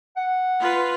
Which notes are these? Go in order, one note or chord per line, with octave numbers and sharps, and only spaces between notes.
F#5
F4 B4